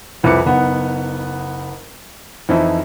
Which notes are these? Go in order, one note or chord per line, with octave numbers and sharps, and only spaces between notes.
C2 F2 E4 B4 D6 C#7
F#1 B3 D#4 F#5
F2 E3 F3 D#4 E4